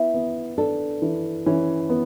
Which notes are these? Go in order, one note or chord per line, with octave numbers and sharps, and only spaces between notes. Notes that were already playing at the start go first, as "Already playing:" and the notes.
Already playing: B3 E4
B3
D4 A4
E3
E3 C#4
B3